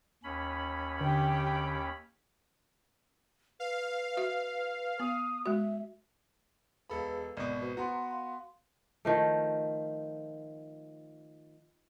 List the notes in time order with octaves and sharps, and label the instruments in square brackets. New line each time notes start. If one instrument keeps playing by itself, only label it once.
[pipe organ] D#2 C#4 B5
[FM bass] D3 [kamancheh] G4 G5
[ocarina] B4 [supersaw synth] F5
[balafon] F#4 E5
[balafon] B3 [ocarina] D#6
[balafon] G#3 F#4 [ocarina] E5
[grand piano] E1 A4 B5 [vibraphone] G#4 B4 F5
[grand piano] G#1 B2 [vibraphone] D5
[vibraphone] F#4 B4 C5
[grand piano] B3 F#4 [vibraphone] A#5 C6
[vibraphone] F5 C6
[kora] D#3 F3 A3